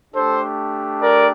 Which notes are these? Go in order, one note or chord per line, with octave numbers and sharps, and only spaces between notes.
A3 D4 G4 A4 C5
A#4 D5